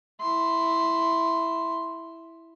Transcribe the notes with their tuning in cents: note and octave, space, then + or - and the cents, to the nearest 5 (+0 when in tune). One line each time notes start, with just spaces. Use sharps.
E4 +0 C6 +0